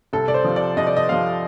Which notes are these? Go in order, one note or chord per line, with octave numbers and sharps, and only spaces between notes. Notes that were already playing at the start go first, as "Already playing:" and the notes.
C2 A4
D5
C5
C3 F3
D5
C2 D#5
D5
D#5
C3 F3 F5